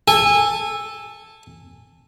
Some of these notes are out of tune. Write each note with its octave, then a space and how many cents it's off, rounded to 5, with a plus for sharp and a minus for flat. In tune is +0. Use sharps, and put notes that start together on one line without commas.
A4 +0 G#5 -20